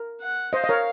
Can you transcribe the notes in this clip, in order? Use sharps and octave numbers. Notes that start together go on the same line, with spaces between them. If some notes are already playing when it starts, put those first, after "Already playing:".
Already playing: A#4
F#5
C5 D#5 F5
D#5
A#4 C#5